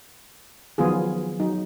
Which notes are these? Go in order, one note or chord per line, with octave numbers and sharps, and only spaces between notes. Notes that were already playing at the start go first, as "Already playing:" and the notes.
D#3 F3 F#3 B3 F4 G#4
F#3 D#4